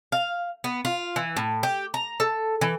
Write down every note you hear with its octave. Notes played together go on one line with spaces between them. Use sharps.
F5
B3
F4
E3
A2
G4
A#5
A4
E3